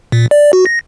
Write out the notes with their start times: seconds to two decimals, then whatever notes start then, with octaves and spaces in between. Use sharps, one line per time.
0.12 A#2
0.31 D5
0.53 F#4
0.66 A#6